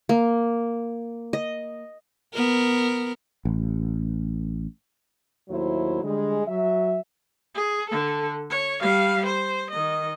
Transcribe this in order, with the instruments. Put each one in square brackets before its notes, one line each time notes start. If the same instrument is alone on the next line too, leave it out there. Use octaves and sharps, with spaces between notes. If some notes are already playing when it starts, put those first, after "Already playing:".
[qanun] A#3
D#5
[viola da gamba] B3 A#4
[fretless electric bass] A1
[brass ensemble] D#2 A2 F#3 E4 C5
D3 G3 G#3
F#3 E5
[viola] G#4
D3 A4
C#5
G3 F5
C5
D#3 D#5